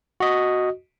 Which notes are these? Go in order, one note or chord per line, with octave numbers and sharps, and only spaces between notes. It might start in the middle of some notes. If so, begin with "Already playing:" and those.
F#4 D#5